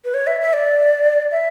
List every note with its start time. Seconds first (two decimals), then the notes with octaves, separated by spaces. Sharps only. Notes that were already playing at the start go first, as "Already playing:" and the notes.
0.05 B4
0.14 C#5
0.27 E5
0.41 E5
0.53 D5
1.31 E5